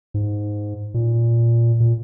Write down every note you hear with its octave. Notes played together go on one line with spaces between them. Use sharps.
G#2
A#2
A#2